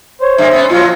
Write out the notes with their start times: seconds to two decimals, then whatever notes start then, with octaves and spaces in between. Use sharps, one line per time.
0.21 C5 C#5
0.38 G2 D3 A#3 E5
0.51 B3 C#4
0.70 A#2 F3 F#3 F4